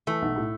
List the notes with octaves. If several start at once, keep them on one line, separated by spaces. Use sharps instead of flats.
E3 A3
B1
A2